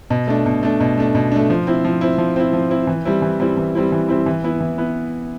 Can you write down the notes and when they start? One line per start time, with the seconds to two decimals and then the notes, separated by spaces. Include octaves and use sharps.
0.10 B2
0.27 A3 D4
0.46 B2
0.63 A3 D4
0.80 B2
0.98 A3 D4
1.15 B2
1.32 A3 D4
1.50 F3
1.67 C4 E4
1.85 F3
2.01 C4 E4
2.18 F3
2.36 C4 E4
2.53 F3
2.70 C4 E4
2.87 E3
3.05 G3 C4 E4
3.22 E3
3.40 G3 C4 E4
3.57 E3
3.75 G3 C4 E4
3.92 E3
4.09 G3 C4 E4
4.26 E3
4.44 B3 E4
4.60 E3
4.78 B3 E4